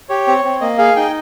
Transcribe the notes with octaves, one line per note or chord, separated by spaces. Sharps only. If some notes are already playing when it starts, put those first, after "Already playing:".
G4 C#5
C4
C4
A#3 D#5
G#4 F5
D#4 G5